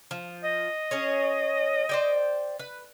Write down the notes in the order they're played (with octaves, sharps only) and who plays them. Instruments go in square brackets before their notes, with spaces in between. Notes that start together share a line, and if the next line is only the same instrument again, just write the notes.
[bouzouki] F3
[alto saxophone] D#5
[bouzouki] C#4 G#4 C#5
C5 D5 G5
B4